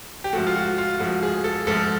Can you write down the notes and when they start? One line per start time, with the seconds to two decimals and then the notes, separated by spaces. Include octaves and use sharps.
0.24 G4
0.33 G#2 F3 A3 F#4
0.47 F4
0.55 F#4
0.78 F4
0.99 G#2 F3 A3 F#4
1.23 G#4
1.44 A4
1.67 G#2 F3 A3 A4